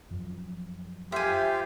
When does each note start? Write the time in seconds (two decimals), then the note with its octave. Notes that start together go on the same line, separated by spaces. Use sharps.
0.11 F#2 F3
1.12 F4 G4 C5 E5 F5 G#5